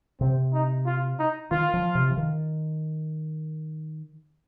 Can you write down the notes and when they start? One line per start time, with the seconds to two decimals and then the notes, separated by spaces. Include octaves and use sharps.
0.20 C3 C4
0.54 D#4
0.86 F4
1.19 D#4
1.51 D#3 F4
1.74 F3
1.95 C3
2.11 F3
2.17 D#3